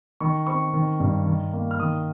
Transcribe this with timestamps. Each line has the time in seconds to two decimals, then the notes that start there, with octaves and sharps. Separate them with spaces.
0.20 D#3 C#6
0.47 C4 C#6
0.74 D#3
1.00 G2
1.26 D#3
1.53 A#3
1.71 F6
1.79 D#3 D#6